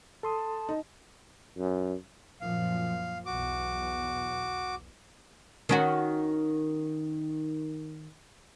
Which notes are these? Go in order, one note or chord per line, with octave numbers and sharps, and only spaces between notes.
A4 A5 C6 D#6
D#4
F#2
F#2 A#2 F3 F5
B1 E2 F#4 D6
D#3 C#4 F#4